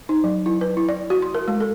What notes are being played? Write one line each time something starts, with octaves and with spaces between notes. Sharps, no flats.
D#4
F#3
E4
B4
E4
D5
F#4
C6
A#4
G#3
A4